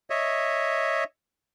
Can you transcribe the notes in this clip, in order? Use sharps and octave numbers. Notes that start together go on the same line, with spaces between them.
C#5 D#5 E5